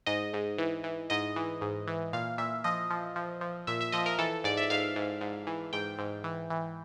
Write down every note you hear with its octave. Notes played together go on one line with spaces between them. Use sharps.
G#2 D#5
G#2
E3
E3
G#2 D#5
E3
G#2
E3
A#2 F5
A#2 E5
F3 D#5
F3
F3
F3
A#2 E5
E5
F3 D#5
A#4
E3 A4
G#2 D5
E5
G#2 F5
G#2
G#2
E3
G#2 G5
G#2
E3
E3